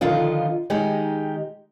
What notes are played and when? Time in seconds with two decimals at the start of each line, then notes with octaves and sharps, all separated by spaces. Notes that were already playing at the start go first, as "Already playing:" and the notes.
0.01 D3 D#3 F3 F4 D#5
0.70 D#3 G#3 D#4 G4